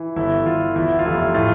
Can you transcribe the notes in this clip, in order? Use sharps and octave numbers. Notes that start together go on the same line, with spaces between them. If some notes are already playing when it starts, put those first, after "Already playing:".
Already playing: E3
G1 E4
G1 F4
E2 E4
F4
F1 E4
A2 F4